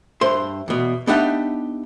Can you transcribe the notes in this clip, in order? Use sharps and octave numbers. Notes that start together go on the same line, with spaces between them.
G2 C5 E5 C6
E2 B2
B3 D4 D#4 G4 E5 F#5